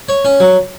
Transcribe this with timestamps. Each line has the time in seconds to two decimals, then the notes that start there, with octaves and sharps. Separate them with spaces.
0.09 C#5
0.25 C#4
0.40 F#3